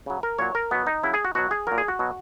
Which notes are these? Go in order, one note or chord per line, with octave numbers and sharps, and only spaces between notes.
C#3 F#3
A#4
A#2 F#3 C#5
A#4
B2 F#3 B3
D#4
C#3 F#3 E4
G#4
F#4
B2 F#3 F#4
G#4
A#2 F#3 A#4
G#4
F#4
B2 F#3